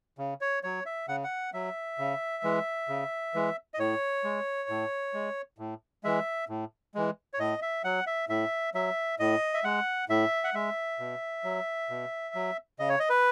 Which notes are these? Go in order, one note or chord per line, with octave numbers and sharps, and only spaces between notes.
C#3
C#5
F#3 C#5
E5
C#3 F#5
F#5
F#3 E5
C#3
E3 G#3
C#3
E3 G#3
D#5
A2 C#5
G#3
A2
G#3
A2
E3 G#3 E5
A2
E3 G#3
C#5
A2 D#5
E5
F#3 F#5
E5
A2 E5
F#3 E5
A2 D#5
E5
G#3 F#5
A2 E5
F#5
G#3 E5
B2
F#3
B2
F#3
C#3 D#5
C#5
D#5
B4